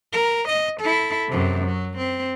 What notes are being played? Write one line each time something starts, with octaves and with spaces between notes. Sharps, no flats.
A#4
D#5
E4 A4
F#2 C3
F#3
C4